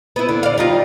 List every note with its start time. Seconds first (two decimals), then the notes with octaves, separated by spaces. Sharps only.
0.16 B3 E4
0.29 D3
0.43 D5 F5
0.58 G3 D#4 F4